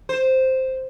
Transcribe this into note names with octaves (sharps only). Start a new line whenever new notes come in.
C5